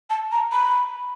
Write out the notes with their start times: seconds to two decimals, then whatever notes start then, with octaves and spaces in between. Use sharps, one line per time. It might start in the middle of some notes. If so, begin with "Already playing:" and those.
0.09 A5
0.31 A#5
0.51 B5